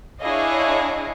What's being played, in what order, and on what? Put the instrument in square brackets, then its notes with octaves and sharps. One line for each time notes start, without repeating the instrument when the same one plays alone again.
[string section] D4 E4 G#4 C#5 D#5 F5